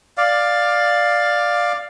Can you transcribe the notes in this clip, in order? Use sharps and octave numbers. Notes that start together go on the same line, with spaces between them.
D5 F5